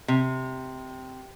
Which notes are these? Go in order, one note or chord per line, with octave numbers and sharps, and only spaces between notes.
C3